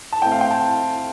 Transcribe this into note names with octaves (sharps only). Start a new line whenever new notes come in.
A5
A2 A3 C4 G5
F5
G5
A5